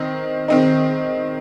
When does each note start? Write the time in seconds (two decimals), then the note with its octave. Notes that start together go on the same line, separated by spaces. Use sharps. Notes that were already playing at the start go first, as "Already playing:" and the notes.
Already playing: D#3 C4 D#4
0.48 D#3 C4 D#4